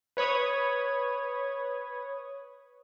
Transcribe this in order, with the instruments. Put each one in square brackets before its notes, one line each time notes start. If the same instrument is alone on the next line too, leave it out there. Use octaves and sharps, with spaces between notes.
[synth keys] B4 C#5 B5 D#6 G#6